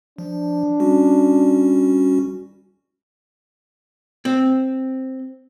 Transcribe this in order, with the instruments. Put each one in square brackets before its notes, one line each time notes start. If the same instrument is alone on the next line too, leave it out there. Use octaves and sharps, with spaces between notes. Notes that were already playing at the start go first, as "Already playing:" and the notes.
[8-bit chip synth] F3 [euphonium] D4
[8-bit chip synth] G3 C#4 F#4
[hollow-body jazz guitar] C4